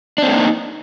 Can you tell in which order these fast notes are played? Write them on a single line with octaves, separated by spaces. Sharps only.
D4 C4 A3 A#3 D#4